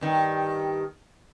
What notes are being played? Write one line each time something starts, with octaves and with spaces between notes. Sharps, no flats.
G2 D#3